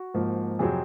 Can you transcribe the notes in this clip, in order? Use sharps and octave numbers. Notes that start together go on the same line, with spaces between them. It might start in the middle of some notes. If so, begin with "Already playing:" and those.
Already playing: F#4
G#2 F3 A#3
F2 C3 F#3 C4 G#4